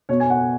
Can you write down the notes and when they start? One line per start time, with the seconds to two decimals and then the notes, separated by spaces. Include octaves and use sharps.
0.09 B2 C#5
0.20 G#5
0.30 F#5